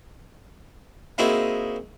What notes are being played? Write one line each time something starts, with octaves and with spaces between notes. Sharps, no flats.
A#3 C4 D#4 E4 F#4 G#4